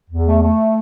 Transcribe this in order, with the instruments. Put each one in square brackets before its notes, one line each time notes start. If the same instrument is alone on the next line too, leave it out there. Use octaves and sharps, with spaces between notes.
[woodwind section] E2
A3
A3